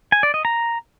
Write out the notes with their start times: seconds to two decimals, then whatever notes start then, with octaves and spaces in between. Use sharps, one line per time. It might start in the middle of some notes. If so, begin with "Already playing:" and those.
0.12 G#5
0.23 D5
0.34 D#5
0.45 A#5